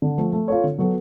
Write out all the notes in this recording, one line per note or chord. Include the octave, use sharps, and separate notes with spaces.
D3
F3 A3
A3
F4 A4 C#5
D3
F#3 B3 F#4 A4